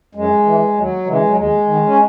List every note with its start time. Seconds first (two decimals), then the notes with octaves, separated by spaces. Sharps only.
0.15 F#2 G#3
0.46 E3
0.76 D#2 F#3
1.06 C#3 E3 G#3
1.27 F#3
1.37 D#2 G#3
1.67 D#3
1.86 C#4